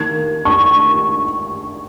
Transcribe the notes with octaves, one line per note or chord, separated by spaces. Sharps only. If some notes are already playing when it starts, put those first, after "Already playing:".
Already playing: D#3 A#3 G#6
C#6